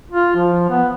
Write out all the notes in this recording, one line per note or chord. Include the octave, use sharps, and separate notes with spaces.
F4
F3
B3